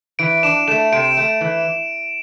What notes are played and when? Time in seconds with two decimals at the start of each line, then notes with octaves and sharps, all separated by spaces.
0.19 E3 D7
0.43 D4 E7
0.68 A3 E7
0.92 C3 D7
1.17 A3
1.41 E3